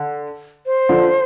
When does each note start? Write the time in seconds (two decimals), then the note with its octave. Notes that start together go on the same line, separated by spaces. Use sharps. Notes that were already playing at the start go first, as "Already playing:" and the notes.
Already playing: D3
0.66 C5
0.89 D3 F3